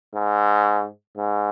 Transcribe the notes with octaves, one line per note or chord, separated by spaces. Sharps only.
G#2
G#2